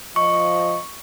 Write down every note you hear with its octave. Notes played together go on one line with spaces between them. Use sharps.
F3 D#5 C#6